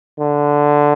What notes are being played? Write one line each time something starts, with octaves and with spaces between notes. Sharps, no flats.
D3